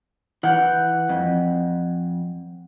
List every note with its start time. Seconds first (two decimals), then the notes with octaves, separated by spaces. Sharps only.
0.43 E3 F#5 F#6 G6
1.09 F2